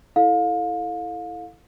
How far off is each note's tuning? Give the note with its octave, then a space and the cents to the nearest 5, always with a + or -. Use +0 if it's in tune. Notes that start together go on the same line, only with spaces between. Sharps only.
E4 -5 A4 +0 F5 +30